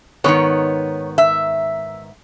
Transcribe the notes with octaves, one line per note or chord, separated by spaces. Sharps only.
G#2 D#3 G#3 B3 C#5
E5